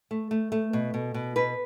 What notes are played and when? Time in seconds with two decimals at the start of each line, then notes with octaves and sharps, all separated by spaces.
0.11 A3
0.31 A3
0.52 A3
0.73 B2
0.94 B2
1.14 B2
1.36 B2 B4